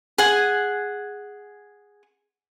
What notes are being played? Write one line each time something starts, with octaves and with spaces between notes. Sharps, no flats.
G#4 F#5 G#5